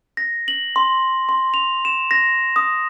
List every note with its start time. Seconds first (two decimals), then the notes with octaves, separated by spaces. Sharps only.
0.17 A#6
0.48 F#7
0.76 C6
1.29 C6
1.54 F7
1.85 E7
2.11 A#6
2.56 D#6